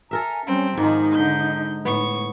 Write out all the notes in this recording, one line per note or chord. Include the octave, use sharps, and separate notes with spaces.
A4 A#4 E5 G#5 A#5
G3 C4 C#4
G#2 D#3 F3 D#4
D3 G6
A2 B3 C#6